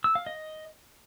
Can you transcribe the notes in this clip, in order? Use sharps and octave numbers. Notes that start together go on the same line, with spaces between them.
E6
F5
D#5